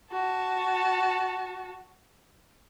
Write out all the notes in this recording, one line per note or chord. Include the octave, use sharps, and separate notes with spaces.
F#4 A5